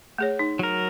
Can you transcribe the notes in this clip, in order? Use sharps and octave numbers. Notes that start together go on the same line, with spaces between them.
A3 G#4 C#5
D#4
F#3 A#4